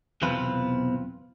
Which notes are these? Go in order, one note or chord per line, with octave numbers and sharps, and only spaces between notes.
B1 E2 C3 C4 F4 B4